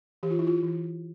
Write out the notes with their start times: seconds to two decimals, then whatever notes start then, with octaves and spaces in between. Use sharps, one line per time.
0.23 E3 G4
0.31 F4
0.39 E4
0.47 F4
0.63 E3